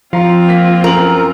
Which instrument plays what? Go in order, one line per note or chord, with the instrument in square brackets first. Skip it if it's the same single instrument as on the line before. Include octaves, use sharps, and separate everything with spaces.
[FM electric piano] F3 [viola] C4 F4 [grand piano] F5 A#5 C6
[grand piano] A#3 B6
[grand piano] F#2 F#7 [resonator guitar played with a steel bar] A#4